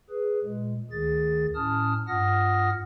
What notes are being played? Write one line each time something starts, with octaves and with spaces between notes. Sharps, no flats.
G#4 B4
A#2 G#3
D2 D#3 G#4 A6
A2 C#4 A5 D#6 F6
G2 F4 F#5 D#6 F6 A#6